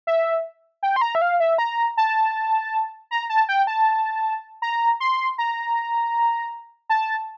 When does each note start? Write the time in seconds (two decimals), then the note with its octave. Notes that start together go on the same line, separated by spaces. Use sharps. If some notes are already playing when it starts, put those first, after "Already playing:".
0.07 E5
0.83 G5
0.96 C6
1.01 A#5
1.15 E5
1.22 F5
1.40 E5
1.58 A#5
1.97 A5
3.11 A#5
3.30 A5
3.49 G5
3.67 A5
4.62 A#5
5.00 C6
5.38 A#5
6.90 A5